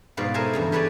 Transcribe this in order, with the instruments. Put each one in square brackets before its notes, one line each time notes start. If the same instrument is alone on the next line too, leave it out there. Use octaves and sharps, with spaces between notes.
[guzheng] G#2 B2 F4 D5
A4 A#4 C5 E5 G#5
E2 G2 C#3
G4 A4 B4 C#5 D5 G#5